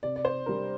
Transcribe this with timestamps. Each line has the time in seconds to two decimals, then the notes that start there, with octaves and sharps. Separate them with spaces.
0.03 C3 D5
0.16 D5
0.25 C5
0.46 G3 D4 A#4